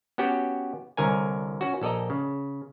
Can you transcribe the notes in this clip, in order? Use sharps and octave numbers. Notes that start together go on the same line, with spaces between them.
B3 C#4 F#4 G4 G5
C2 D3 A#4 C#5 G#5
C#4 F#4
A#1 A4 D5 D#5 A#5
C#3